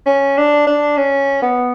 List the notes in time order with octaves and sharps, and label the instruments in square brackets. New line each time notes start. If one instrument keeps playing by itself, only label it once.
[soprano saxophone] C#4
D4
D4
C#4
B3